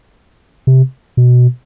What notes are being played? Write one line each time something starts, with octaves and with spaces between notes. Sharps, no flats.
C3
B2